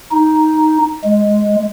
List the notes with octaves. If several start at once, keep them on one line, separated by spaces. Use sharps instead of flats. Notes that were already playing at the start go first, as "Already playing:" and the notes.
D#4
G#3